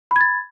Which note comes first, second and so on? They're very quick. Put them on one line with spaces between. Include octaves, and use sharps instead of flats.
B5 G#6 A6